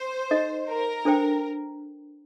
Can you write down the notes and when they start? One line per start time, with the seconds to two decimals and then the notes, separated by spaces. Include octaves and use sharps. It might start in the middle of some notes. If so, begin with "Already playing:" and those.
Already playing: C5
0.31 D#4 A4 D#5
0.68 A#4
1.05 D4 A4 C5 G5